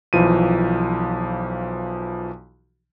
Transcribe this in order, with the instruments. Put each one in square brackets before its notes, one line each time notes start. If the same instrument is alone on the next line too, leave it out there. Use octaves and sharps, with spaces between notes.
[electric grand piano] B1 E3 F3 D#7